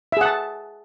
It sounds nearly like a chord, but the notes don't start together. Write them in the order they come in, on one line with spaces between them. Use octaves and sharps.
E5 G#4 F#5 A5